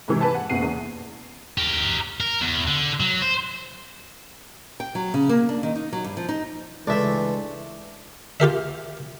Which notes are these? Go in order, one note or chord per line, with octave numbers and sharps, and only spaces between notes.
G#2 C3 E3
B4 A5
F#5
F#1 B2 F#5 C7 D#7
E2
G4 A#4
A#4
E2
D3
F#3
C5
G5
F#3
C#3
A#3
D4
D#3
D#4
F#3
G2
F3
D#4
C#2 E3 A3 D4 E5
F4 G4 A#4 E5